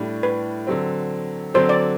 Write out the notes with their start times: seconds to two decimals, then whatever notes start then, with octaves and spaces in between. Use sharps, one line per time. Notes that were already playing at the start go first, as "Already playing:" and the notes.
Already playing: A2 G3 D4
0.23 B4
0.67 D3 F#3 C4
1.54 D3 F#3 C4 C5
1.69 D5